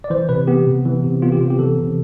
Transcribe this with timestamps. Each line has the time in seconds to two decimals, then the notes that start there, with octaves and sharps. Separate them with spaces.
0.04 D5
0.10 E3 C5
0.29 C3 B4
0.47 B3 G4
0.67 C3
0.86 E3
1.04 C3
1.22 B3 F4
1.32 G4
1.41 C3 F4
1.50 G4
1.59 E3 A4
1.78 C3